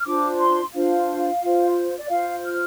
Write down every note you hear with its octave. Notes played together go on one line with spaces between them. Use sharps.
F6
D4 F4 C5 D6
C6
D4 F4 C5 F5
F4 C5
D5
F4 C5 F5
F6